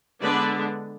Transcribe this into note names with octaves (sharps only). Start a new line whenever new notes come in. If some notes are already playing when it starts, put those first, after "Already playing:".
D3 G#3 B3 D4 B4 D5